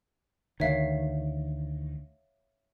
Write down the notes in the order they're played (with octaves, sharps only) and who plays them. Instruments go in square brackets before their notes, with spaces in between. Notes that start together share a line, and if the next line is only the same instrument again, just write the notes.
[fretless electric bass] D2 D#3 [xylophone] C#5 E5 F5